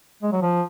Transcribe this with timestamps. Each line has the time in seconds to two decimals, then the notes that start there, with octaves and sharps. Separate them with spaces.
0.22 G#3
0.33 F#3
0.42 F3